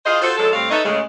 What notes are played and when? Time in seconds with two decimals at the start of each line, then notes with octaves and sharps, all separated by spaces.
0.05 E4 F4 G#4 C5 D#5 F5
0.21 F4 F#4 A4 C5
0.37 F3 F#3 G#3 A4
0.52 A2 G3 C4 F5
0.70 D#4 A4 B4 C#5 D#5 E5
0.84 A2 C#3 G#3